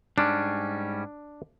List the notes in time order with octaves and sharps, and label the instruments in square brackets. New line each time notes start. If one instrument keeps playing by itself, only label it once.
[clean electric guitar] G#2 G3 C#4 [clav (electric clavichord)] D4